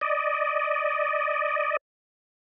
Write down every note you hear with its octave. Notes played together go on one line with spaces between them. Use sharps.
D5 D#5